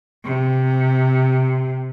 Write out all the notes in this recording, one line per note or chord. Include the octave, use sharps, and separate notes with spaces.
C3